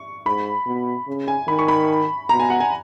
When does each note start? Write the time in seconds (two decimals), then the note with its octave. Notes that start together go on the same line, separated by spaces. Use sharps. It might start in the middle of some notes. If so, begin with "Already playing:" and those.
Already playing: C#6
0.26 G#2 B5
0.67 B2
1.08 C#3
1.28 G#5
1.48 D#3 B5
1.59 C#6
1.68 B5
2.29 B2 A#5
2.40 G#5
2.50 F#5
2.60 G#5